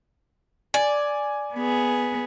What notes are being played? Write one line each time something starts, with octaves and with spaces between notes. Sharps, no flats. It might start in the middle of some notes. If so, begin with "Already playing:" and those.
D5 G#5
B3 G#4